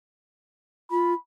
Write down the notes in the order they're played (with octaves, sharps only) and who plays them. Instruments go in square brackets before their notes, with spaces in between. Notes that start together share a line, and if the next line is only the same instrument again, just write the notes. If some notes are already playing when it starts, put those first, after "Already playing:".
[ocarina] F4 [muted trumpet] B5